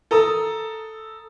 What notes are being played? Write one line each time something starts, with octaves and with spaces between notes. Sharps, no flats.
A4 A#5 D#6 E6